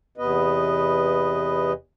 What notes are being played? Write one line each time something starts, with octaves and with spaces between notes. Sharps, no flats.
E2 C3 B3 B4 D#5